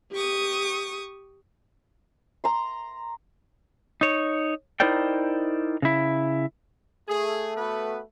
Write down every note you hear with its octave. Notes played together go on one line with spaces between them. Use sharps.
G4 C#6 D#6
A#5 C6
D#4 C#5
D#4 E4 A#4 C5 D5 G5
C#3 E4
A3 G#4
B3 F#4 B4